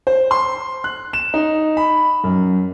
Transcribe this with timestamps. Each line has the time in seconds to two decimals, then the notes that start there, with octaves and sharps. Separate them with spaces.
0.07 C5
0.31 C6
0.84 F#6
1.13 E7
1.34 D#4
1.77 B5
2.24 F#2